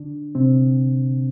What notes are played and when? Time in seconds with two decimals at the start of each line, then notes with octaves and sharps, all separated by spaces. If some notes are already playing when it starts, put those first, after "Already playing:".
Already playing: D3 D4
0.35 C3 C4